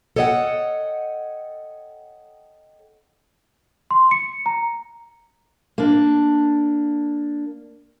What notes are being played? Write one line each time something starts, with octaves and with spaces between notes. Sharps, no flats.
A4 C#5 D#5 E5 F#5 G5
C6
C#7
A#5
A#3 D4